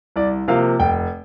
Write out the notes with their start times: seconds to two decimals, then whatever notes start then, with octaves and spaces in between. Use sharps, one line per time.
0.16 C2 D5
0.48 C3 F3 A#3 F5
0.79 F1 G5